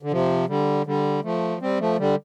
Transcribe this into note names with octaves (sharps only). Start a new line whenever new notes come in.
D3
C3 F3
D3 G3
D3 G3
F3 A3
G3 C4
F3 A3
D3 G3